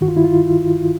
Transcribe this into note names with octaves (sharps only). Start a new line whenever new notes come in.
G2 D#3 F#4
F4
E4
F4